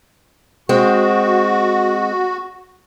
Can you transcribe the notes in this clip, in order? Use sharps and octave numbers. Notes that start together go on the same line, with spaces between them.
G#3 C4 F#4